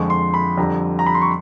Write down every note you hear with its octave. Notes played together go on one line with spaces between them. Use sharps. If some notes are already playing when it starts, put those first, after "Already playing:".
Already playing: F2 D3 F3 G#3 C#6
C6
B5
F2 D3 G3 A#5
A#5
B5
C6
C#6